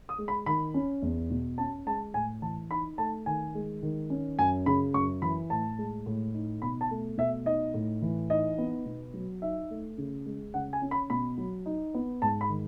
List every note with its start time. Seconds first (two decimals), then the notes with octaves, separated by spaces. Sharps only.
0.09 D#6
0.18 G#3
0.28 B5
0.46 D#3 B5
0.74 C#4
1.02 E2
1.30 B2
1.58 C#4 A5
1.86 G#3 A5
2.14 A2 G#5
2.42 E3 A5
2.70 D#4 B5
2.98 A3 A5
3.26 D#3 G#5
3.55 G#3
3.83 D#3
4.10 C#4
4.38 F#2 G#5
4.66 C#3 B5
4.94 F#2 C#6
5.22 E3 B5
5.50 A2 A5
5.78 G#3
6.06 A2
6.34 D#4
6.62 B2 B5
6.81 A5
6.90 A3
7.18 B2 E5
7.46 D#4 D#5
7.74 A2
8.02 E3
8.30 D#4 D#5
8.58 B3
8.86 B2
9.14 F#3
9.42 D#4 E5
9.70 A3
9.98 C#3
10.26 G#3
10.54 C#3 F#5
10.73 G#5
10.82 C#4
10.91 B5
11.10 B2 B5
11.38 F#3
11.66 D#4
11.94 B3
12.22 G#2 A5
12.41 B5
12.49 D#3